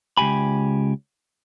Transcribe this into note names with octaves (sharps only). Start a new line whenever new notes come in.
C#2 G2 G4 G#5 B5